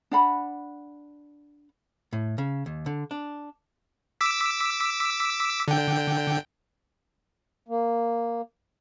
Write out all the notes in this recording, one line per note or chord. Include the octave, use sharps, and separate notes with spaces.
D4 F#5 B5
A2
C#3
D#2
D3
D4
D6 E6 B6
D3 G5
A#3